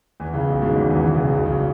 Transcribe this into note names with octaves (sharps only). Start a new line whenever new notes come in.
E2 E3
C#2 C#3
B1 B2
G#1 G#2
G#1 G#2
E2 E3
E2 E3
C#2 C#3
B1 B2
B1 B2
C#2 C#3